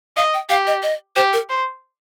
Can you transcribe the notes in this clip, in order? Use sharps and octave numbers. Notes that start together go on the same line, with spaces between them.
D#5 F5
G5
G4 F5
D#5
D#5
G4 C5
A#4
C5